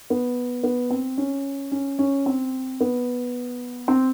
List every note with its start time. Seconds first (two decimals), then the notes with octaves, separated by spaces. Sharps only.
0.10 B3
0.64 B3
0.90 C4
1.18 C#4
1.72 C#4
1.99 C#4
2.26 C4
2.81 B3
3.88 C4